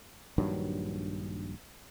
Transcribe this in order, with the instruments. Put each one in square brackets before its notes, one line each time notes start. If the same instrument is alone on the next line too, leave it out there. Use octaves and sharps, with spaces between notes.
[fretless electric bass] A#1 G2 D#3 F#3